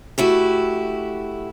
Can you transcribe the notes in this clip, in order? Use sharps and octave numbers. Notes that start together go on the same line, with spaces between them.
A3 E4 F#4 G4